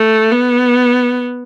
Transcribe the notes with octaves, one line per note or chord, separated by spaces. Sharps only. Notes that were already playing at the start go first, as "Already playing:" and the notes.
Already playing: A3
B3